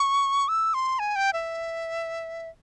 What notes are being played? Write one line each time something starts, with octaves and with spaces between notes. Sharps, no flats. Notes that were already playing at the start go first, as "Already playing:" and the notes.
Already playing: C#6
E6
C6
G#5
G5
E5